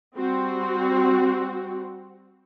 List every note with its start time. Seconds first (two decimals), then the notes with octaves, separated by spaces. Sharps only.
0.16 G3 C4 F#4